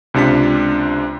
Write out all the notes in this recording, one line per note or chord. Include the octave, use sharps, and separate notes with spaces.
C#2 C3 D4 F4 B6